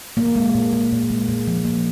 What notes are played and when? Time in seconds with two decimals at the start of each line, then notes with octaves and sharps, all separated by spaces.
0.17 A#2 A#3
0.36 G#3
0.54 A#2
0.73 G#3
0.92 A#2
1.10 G#3
1.28 A#2
1.47 F3
1.65 A#3